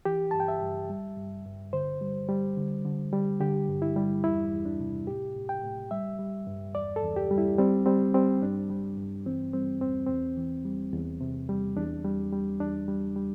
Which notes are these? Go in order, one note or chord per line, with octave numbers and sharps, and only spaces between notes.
E3 G4
G2 A5
G5
E5
G2
G3
G2
G2
D3 C5
G3
G3
D3
D3
G3
D3 G4
G2
E4
G3
E2 E4
E2
D4
C3
A2 G4
A2
G5
A2
G3 E5
G3
G2
E2 D5
A4
E2
G4
G3
E4
G3 C4
G3 C4
G3 C4
G2 D4
G3
G2
E3 C4
G3 C4
E2 C4
E2 C4
E3
G3
E2
C3
G3
E2 D4
G3
G3
E2 D4
G3
G3